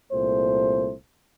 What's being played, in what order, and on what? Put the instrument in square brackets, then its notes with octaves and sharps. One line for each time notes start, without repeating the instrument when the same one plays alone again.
[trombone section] C2 A#2 A3 C5